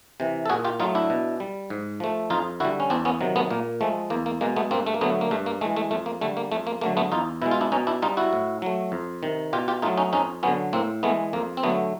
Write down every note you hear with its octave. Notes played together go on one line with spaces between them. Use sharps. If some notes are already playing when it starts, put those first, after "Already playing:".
C3 E3
A4
A#2 F#4 G#4
F4 G4
F#3 A3 D#4 F4
D4 E4
B2
G3
G#2
F3 A3
F2 D#4 F4
D3 G3 E4 F#4
C#4
E2 C4 D4
B3 C#4
C3 D#3 F#3
A3 B3
A#2 A#3
F3 G#3 A3
E2 A#3
A#3
B2 G#3 A#3
A3 B3
G2 A#3 C4
A3
A#3
D3 F#3 A3 B3
A#3
G2 A3
A#3
E3 G#3 A3
A3
F2 A3
A#3
D3 G3 A3
A#3
F2 A3
A#3
D3 F#3 A3 A#3
A3 B3
E2 D#4 F4
B2 G#3 E4
F4
D4 E4
B2 C#4 D#4
D4 E4
G3 D#4 F4
E4 F#4
A2
F#3 A3
F2
C3 D#3
B2 F4 G4
F4 G4
F#3 A3 D#4 F4
C#4 D#4
F2 C#4 D#4
D3 F#3 B3 C#4
A2 A#3 C4
E3 G#3 A3 B3
F2 A#3
C4
D3 F#3 A3 B3